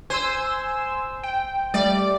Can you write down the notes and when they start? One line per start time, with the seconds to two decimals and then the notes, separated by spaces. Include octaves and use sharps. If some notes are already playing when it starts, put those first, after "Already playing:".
0.10 C5 G#5 C6 E6
1.23 G5
1.74 G3 A3 D5